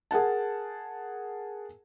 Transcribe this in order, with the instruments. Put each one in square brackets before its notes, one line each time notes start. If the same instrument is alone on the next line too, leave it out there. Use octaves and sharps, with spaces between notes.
[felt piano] G#4 A#4 F#5 A5